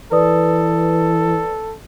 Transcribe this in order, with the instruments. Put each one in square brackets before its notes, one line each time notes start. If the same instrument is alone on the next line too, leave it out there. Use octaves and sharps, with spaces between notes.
[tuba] E3 [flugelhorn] A4 [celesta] B4 D5 D#6